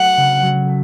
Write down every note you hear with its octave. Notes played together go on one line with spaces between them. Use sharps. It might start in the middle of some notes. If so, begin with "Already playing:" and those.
Already playing: F#3 A3 F#5
C#3
F#3
A3